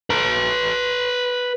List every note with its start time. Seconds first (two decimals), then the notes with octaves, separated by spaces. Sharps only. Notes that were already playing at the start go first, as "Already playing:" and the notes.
0.10 B4 A#5